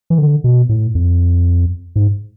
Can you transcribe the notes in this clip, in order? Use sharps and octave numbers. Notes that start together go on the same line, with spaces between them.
E3
D3
B2
A2
F2
G#2